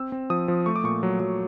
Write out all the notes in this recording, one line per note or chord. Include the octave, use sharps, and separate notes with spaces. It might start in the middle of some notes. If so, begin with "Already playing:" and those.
Already playing: C4 E6
C4
F3 D#6
F3
A3 C#6
D6
A#2 C#6
F#3
F#3